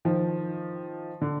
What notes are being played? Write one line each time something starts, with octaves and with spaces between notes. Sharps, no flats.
D#3 F3
D3